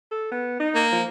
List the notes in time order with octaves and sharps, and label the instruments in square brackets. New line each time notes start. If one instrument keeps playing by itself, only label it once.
[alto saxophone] A4
B3
D#4
[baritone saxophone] A#3
[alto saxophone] F3